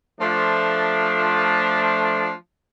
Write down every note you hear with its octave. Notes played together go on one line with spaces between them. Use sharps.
F3 A3 D4